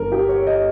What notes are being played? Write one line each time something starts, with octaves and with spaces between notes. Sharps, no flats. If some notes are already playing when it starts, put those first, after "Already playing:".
Already playing: G1 G2 A#4
G4
C#5
D#5